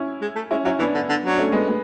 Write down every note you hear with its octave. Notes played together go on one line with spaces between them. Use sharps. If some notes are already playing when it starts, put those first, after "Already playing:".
Already playing: C#4 E4
G#3
A3
G#3 C#4 E4
F#3 C#4 E4
E3 B3 D4
D3
D3
F#3 D4
A3 C#4
G#3 B3
G#3 B3